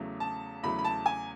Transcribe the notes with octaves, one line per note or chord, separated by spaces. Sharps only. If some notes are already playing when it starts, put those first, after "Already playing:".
Already playing: E2 C#3 F#3 A3
A5
E2 C#3 F#3 A3 B5
B5
A5
G#5